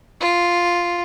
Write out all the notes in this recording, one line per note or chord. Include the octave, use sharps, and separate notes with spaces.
F4